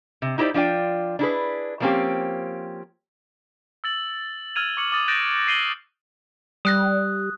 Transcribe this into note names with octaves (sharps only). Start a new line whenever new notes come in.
C3
D#4 E4 G4 C5 D5
F3 D4 F4 D5 G5
D4 E4 G#4 B4
F3 G3 A#3 C4 C#4 G4
E6 A6 F#7
E6 F6 G#6 D#7 F7
C#6 D6 C#7 F#7
D6 D#6 A6
F#6 G6 A6 A#6 D7 E7
A#6 C7 D#7 F#7 G7
G3 D#6 F#6 A#6